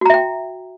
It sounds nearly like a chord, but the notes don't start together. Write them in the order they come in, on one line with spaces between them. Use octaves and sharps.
F#4 A#5 E5 G5